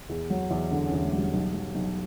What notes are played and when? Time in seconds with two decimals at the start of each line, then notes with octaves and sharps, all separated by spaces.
0.09 E2
0.30 F#3
0.50 E2
0.71 D3 D4
0.87 C#4
0.92 E2
1.02 A3
1.12 F#3
1.18 G3
1.33 B1
1.54 F#3
1.75 B1